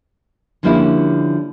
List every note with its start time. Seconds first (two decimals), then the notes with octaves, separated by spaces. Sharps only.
0.63 D3 F3 G3 A#3 C#4 E4